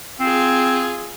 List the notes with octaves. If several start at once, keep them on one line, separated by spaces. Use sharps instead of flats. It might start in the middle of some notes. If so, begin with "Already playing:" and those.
C4 F4 G#4